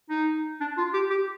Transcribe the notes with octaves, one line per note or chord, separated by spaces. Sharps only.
D#4
D4
F4
G4
G4